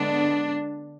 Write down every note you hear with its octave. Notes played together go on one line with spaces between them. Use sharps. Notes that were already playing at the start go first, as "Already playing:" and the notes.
Already playing: D3 G#3 B3 D4